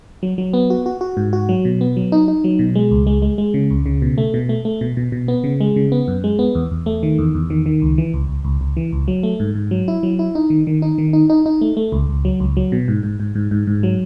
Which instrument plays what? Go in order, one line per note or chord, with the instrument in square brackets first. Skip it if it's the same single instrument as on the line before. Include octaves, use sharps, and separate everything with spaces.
[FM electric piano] F#3
F#3
B3
F#4
F#4
F#4
G#2
F#4
F#3
B2
B3
F#3
D#4
D#4
F#3
B2
G#3
C#2
G#3
G#3
G#3
C#3
C#2
C#3
B2
A3
B2
A3
A3
B2
B2
B2
B3
C#3
G#3
C#3
B3
F#2
G#3
B3
E2
E2
A3
D#3
E2
E2
D#3
D#3
C#2
E3
C#2
C#2
C#2
C#2
E3
C#2
F#3
A3
G#2
G#2
F#3
E4
F#3
E4
D#4
D#3
D#3
D#4
D#3
D#4
D#4
D#4
A3
A3
C#2
C#2
F#3
C#2
F#3
B2
G#2
G#2
G#2
G#2
G#2
G#2
F#3